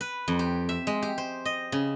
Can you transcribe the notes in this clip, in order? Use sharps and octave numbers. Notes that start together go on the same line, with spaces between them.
B4
F2
G4
E5
G#3
G4
C5
D#5
C#3